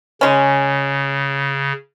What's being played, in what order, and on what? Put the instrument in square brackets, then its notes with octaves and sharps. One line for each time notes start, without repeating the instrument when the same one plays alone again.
[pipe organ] C#3 [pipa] G#3 C#4